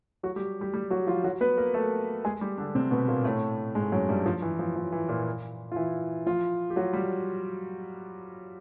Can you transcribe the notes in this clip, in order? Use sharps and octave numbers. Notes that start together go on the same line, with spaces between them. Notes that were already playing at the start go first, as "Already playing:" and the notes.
F#3 F#4
G3 G4
G3 G4
G3 G4
F#3 F#4
F3 F4
F#3 F#4
B3 B4
A#3 A#4
A3 A4
G#3 G#4
G3 G4
D3 D4
C3 C4
B2 B3
A#2 A#3
A2 A3
G#2 G#3
F#2 F#3
G2 G3
F3
E3
F3
F3
E3
A#2 A#3
F4
E3 E4
F3 F4
G4
F#3 F#4
G3 G4